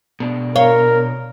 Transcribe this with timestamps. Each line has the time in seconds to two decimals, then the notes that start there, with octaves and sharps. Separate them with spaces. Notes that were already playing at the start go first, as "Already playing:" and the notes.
0.20 B2 D4
0.56 A#4 C#5 F5